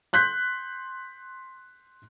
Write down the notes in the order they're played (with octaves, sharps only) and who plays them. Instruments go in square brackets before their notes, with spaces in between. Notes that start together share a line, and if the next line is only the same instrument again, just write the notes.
[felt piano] C6 F#6 G6 B6